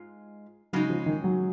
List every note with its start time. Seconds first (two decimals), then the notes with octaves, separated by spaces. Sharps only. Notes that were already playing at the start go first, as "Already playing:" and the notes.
Already playing: G#2 G#3 F4
0.73 C#3 F#3 G#3 D#4
0.90 F3
1.06 D#3
1.24 F#3